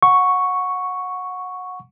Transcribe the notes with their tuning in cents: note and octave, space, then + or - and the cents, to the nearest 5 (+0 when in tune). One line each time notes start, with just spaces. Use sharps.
F#5 -20 C#6 +0